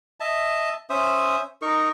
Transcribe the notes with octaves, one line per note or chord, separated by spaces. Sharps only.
D#5 E5 A5
C#4 C5 E5 D#6
D#4 A#4 C#6